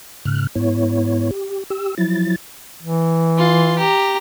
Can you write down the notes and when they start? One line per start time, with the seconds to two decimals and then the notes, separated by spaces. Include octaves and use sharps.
0.25 G#2 C#3 F6 F#6
0.55 G#2 B3 E4 C#5
1.31 G4
1.70 G4 E6
1.98 F3 F#3 E4 A6
2.83 E3
3.38 F4 C6
3.78 G4 A#5